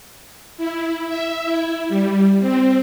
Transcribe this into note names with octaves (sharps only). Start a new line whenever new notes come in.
E4
E5
E4
G3
C4